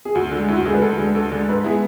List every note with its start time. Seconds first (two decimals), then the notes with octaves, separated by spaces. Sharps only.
0.05 G#4
0.15 D2 F#4
0.31 D3
0.37 G#3
0.48 D2 E4
0.57 F#4
0.65 D3 G#3 G#4
0.74 B4
0.82 D2 A4
0.99 D3 G#3
1.15 D2 A4
1.32 D3 G#3
1.49 G#2 B4
1.64 G#3 B3 E4 G#4